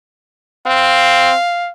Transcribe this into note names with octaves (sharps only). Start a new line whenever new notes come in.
C4 F5